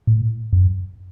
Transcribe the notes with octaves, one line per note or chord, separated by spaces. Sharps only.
A2
F#2